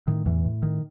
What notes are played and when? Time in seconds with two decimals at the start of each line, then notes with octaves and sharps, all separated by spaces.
0.08 A2 D#3
0.26 E2 E3
0.44 A2
0.63 D#3